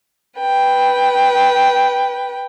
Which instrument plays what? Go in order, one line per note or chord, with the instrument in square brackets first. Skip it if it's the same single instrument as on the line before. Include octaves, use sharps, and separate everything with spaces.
[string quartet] B4 G5